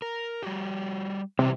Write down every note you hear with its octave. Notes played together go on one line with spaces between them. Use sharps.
A#4
G3 F#4 G4
C3 E3 G3